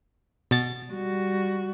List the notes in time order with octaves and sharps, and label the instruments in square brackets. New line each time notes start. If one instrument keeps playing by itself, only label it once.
[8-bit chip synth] B2 A6
[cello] G3 F#4